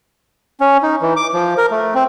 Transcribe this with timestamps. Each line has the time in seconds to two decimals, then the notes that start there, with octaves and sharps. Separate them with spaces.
0.60 C#4
0.83 D#4
1.01 E3
1.16 D6
1.33 F3
1.58 A#4
1.71 A3
1.95 C4